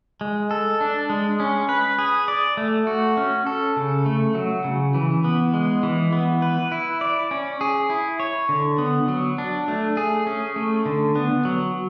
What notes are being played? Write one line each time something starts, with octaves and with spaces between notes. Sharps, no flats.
G#3
A4
D4
G#3
C#4
B4
G#4
D5
A3
F#4
C#4
A4
C#3
A3
F#3
C#3
E3
B3
G#3
E3
B3
B4
E4
D5
C#4
G#4
E4
C#5
D3
B3
F#3
D4
A3
G#4
C#4
A3
D3
B3
F#3